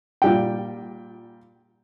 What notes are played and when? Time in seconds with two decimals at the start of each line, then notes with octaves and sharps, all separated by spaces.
0.22 A#2 G3 G5